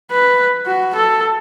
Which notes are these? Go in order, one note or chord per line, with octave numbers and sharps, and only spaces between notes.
B4
F#4
A4